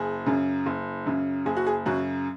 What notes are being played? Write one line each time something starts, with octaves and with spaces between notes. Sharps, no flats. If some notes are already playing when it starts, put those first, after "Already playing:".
Already playing: F#1 G#4
F#2 C#3
F#1
F#2 C#3
F#1 G#4
F#4
G#4
F#2 C#3 F#4